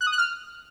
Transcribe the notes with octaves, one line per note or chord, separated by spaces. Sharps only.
F#6
D#6
F#6
F6